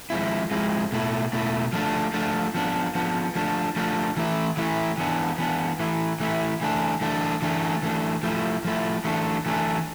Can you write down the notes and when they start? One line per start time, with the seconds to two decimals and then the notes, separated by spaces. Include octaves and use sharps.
0.10 F3 G#3 C4 E4
0.51 F3 G#3 C4 E4
0.92 B2 A3 E4
1.33 B2 A3 E4
1.73 F3 A3 D4
2.14 F3 A3 D4
2.54 F3 B3 D4
2.95 F3 B3 D4
3.35 F3 A3 D4
3.76 F3 A3 D4
4.17 E3 A3 E4
4.57 E3 A3 E4
4.98 E3 B3 D4
5.38 E3 B3 D4
5.79 E3 A3 E4
6.20 E3 A3 E4
6.61 E3 A3 D4
7.01 E3 A3 D4
7.42 E3 A3 D4
7.83 E3 A3 D4
8.23 F3 A3 E4
8.65 F3 A3 E4
9.04 E3 A3 D4
9.46 E3 A3 D4